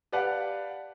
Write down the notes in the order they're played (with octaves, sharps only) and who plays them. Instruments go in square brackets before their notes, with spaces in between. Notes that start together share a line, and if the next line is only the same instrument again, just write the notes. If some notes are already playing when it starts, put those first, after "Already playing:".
[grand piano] G4 B4 D5 F5 F#5 A5